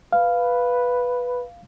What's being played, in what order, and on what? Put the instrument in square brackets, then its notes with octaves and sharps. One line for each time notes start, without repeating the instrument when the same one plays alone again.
[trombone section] B4 [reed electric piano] F5